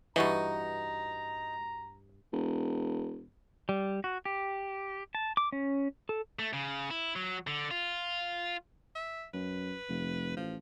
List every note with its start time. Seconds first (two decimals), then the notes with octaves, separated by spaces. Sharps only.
0.16 G2 E3 D#4 F#4 D#5 A#5
2.32 E1
3.69 G3
4.04 F#4
4.25 G4
5.15 A5
5.37 D6
5.52 C#4
6.09 A4
6.39 A3
6.53 C#3
6.90 E4
7.16 F#3
7.47 D3
7.71 F4
8.95 E5
9.34 F#2 B4
9.89 F1
10.37 A1 F3